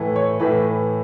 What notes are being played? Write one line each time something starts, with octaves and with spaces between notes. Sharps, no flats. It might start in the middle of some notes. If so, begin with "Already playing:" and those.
Already playing: A2 E3 A3
C#5
A2 E3 A3 B4